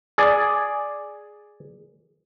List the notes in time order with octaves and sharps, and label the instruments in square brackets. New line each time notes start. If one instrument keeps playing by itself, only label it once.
[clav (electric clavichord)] G#4 D5